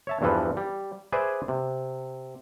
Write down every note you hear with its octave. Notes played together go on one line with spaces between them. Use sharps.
C#5 E5 A5
E2 G2 E3 F3 A4 B4
G3
G#4 B4 C5 D5 E5 G#5
C3